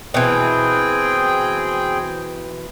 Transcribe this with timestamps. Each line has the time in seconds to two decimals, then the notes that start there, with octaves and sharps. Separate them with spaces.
0.14 B2 E3 C4 G#4 G5